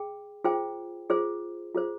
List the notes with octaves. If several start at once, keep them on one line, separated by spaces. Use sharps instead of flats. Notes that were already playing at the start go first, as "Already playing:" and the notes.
Already playing: G#4 G5
F4 G#4 C5 G5
F4 G#4 C5
F4 G#4 C5